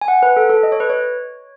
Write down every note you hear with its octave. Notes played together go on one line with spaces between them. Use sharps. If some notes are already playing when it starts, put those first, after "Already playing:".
G#5
F#5
B4
A4
A4
D#5
C#5
B4
C#5